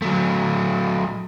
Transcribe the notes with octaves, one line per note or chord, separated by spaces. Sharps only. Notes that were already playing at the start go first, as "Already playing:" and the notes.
F#3 A3